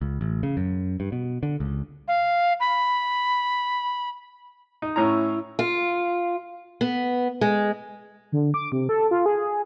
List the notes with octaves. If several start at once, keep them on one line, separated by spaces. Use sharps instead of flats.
C#2
A1
C#3
F#2
G2
B2
D3
C#2
F5
B5
D#4
A2 C#4 E4 A#5
F4
B3
G#3
D3
D6
C3
A4
F4
G#4